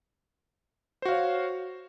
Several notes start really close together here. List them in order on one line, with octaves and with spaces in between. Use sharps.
C5 F#4 F5 C#5